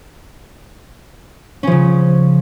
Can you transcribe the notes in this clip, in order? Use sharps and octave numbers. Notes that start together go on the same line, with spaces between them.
C#3 F3 C#4